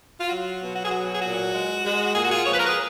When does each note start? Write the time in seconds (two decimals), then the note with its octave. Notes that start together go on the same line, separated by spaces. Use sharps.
0.20 F4
0.29 F#3 F#4
0.61 B2
0.76 F#4
0.84 G#4
0.91 F#3 F#4
1.14 G#4
1.22 A#2 F#4
1.52 G#3
1.84 G#3
2.14 A#2 G#4
2.23 F#4
2.31 F4 G#4
2.46 F3 C#5
2.53 B4
2.59 A#4
2.66 G#4 B4